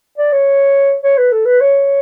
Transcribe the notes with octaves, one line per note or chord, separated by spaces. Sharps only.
D5
C#5
C#5
B4
A4
B4
C#5